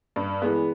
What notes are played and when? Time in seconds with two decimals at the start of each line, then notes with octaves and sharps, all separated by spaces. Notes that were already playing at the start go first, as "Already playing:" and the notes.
0.16 G2
0.42 E3 G#3 B3